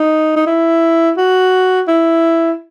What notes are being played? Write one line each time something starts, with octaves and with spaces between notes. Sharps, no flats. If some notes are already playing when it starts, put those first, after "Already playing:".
Already playing: D#4
D#4
E4
F#4
E4